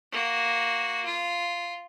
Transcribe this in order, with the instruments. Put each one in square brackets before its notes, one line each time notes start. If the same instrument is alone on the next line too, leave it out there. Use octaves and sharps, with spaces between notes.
[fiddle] A#3 F#4
F4